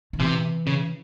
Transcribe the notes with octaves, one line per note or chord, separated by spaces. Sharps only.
D#3
C3 E3
C#3